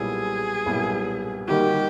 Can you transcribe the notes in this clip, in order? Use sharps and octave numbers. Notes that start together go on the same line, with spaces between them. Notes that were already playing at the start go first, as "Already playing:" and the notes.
Already playing: B1 A#2 G3 B3 E4 G#4
B1 A#2 G3 B3 E4
D#3 G3 A#3 D#4 F#4 G4